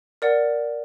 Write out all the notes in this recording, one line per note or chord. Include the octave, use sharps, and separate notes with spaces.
A#4 D5 F#5